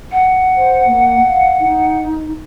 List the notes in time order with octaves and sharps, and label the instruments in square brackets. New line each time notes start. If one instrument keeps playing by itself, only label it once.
[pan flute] F#5
[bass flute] C5
A#3
F5
D#4